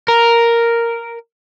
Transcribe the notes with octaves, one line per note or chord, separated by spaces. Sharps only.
A#4